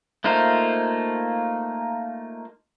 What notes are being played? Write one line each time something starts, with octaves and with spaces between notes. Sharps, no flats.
A3 A#3 D#4 F4 C5